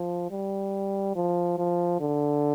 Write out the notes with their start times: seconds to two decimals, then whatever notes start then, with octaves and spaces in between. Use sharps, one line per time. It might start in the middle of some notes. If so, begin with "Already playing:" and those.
Already playing: F3
0.31 G3
1.15 F3
1.58 F3
2.01 D3